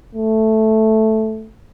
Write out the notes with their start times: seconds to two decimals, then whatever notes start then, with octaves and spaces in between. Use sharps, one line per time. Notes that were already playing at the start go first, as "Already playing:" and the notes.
0.15 A3